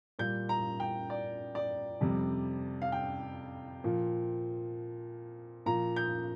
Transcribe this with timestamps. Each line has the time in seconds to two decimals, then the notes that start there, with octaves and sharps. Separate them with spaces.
0.19 A#2 G3 G6
0.49 A#5
0.80 G5
1.10 D5
1.55 D5
2.01 F2 C3 G3
2.82 F5
2.92 G5
3.84 A#2 F3
5.66 A#2 F3 A#5
5.96 G6